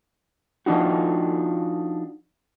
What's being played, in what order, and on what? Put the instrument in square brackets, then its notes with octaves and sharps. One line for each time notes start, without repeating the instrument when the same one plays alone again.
[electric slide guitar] F3 D4 D#4 F#4